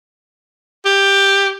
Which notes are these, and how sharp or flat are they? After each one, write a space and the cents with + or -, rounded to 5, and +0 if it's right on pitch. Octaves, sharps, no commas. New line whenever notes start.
G4 +10